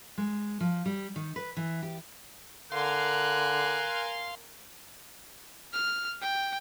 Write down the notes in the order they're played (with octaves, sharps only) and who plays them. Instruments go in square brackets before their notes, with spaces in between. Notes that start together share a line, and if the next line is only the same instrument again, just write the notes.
[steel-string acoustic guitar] G#3
F3
G3
D#3
B4
E3
G4
[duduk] D3 [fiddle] A#4 G#5 [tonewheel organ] F5 C6 [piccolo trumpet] F#6
[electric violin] F6
G5